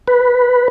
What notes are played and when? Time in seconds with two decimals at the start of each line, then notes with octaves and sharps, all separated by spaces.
0.08 B4